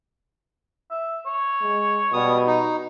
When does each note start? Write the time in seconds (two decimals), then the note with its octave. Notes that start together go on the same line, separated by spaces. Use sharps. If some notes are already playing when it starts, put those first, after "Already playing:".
0.91 E5
1.26 C#5
1.61 G#3
2.13 B2 G3 D#6
2.47 D#4